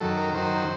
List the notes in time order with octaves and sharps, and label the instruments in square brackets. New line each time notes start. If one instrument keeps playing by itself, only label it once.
[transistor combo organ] F#2 D#3 F#3 A4
A#4
F#2 D#3 F#3 C5